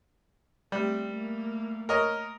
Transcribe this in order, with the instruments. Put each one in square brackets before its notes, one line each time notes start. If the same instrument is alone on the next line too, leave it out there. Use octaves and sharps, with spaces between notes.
[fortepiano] G3 [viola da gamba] A3 C4
[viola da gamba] A3 A#3
[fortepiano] A#4 C#5 D#5